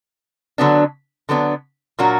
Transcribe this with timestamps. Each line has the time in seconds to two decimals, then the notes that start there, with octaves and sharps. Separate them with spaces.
0.58 D3 F#3 B3 D4
1.29 D3 F#3 B3 D4
1.99 A#2 F#3 A#3 D4 F#4